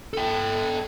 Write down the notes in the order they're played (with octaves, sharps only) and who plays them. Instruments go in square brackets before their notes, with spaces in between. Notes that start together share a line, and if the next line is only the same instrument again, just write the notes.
[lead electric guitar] A4 G5